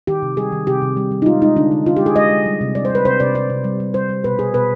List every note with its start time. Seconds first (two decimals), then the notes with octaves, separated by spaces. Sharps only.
0.07 D#3 G4
0.22 C3
0.37 G3 G#4
0.52 D#3
0.67 C3 G4
0.82 C3
0.97 G3
1.12 G3
1.22 D#4
1.26 G#3 F4
1.42 G#3 D#4
1.56 D3 D4
1.71 D3
1.86 D3 F4
1.97 G#3 G4
2.06 G#4
2.16 G#3 D#5
2.31 G#3
2.46 G3
2.61 C3
2.75 G3 D5
2.85 C5
2.90 G3
2.95 B4
3.05 C3 C5
3.20 C3 D5
3.35 C3 D5
3.50 C3
3.64 G3
3.80 G3
3.94 G3 C5
4.10 G3
4.24 B2 B4
4.39 B2 G#4
4.54 B2 B4